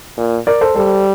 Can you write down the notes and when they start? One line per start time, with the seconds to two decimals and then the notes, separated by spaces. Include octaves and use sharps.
0.18 A#2
0.47 A#4 D5
0.61 A4 C5
0.76 G3 A4 C5